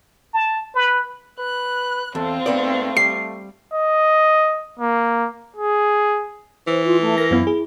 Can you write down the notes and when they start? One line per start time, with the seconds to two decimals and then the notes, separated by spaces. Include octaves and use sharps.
0.34 A5
0.75 B4
1.39 B4 F#6
2.15 E2 C4 F4 A4
2.46 G#2 A3 B3 D5
2.97 G3 C7
3.74 D#5
4.79 A#3
5.57 G#4
6.67 E3 C5
6.84 F4
7.00 A3
7.18 A#4 A#6
7.31 F#2 B3 E4
7.47 G#4